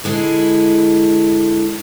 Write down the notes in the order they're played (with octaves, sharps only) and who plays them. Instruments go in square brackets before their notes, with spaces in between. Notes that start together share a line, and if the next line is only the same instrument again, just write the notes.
[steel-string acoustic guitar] D3 G#3 E4